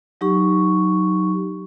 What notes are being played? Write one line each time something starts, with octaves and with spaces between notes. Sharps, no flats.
F#3 D#4 G4 C#6